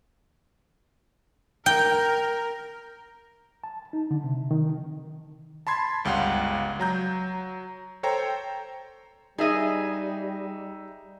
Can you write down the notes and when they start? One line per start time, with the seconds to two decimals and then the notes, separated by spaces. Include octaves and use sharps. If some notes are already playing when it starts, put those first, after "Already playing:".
1.66 A#4 G5
3.64 A5
3.93 D#4
4.11 D3
4.24 C3
4.51 D#3
5.67 A5 B5 C6 G#6
6.04 G1 C#2 G3 F5 F#5
6.79 F#3 A#5 G6
8.03 A4 C5 C#5 G5 A#5
9.38 G3 D#4 G#4 D#5 E5